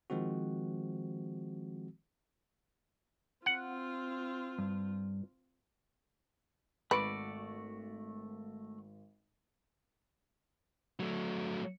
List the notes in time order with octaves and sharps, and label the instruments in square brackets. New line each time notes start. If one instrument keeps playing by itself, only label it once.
[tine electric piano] D#3 F3 G#3 C4 F#4
[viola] C4 F4 [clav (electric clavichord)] F#5
[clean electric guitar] G2
[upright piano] G#1 [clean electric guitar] A3 F#4 D5 [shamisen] B4
[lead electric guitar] F#3 A3